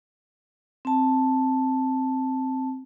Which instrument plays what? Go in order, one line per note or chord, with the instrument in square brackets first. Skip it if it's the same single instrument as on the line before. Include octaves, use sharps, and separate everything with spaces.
[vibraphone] C4 A5